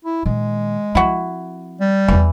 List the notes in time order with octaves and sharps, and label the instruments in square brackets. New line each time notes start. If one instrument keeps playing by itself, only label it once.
[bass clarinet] E4
[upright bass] A#2 D#3 [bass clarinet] G#3
[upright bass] F3 C4 [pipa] E4 F#4
[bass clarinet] G3
[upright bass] D#1 E2 [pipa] E3